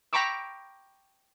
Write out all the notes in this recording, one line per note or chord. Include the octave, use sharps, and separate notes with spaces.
G5 A#5 B5 C#6 D6 E6